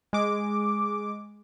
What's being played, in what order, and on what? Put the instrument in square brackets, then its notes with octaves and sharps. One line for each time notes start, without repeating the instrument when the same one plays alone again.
[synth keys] G#3 D6